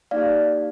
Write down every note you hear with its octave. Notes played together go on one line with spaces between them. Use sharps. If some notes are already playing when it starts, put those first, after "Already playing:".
A#3 D#4 G4 D5 F5